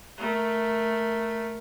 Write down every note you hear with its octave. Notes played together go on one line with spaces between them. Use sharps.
A3 A#4